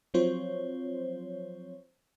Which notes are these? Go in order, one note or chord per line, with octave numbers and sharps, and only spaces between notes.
F3 F#3 C4 F4 C5 C#5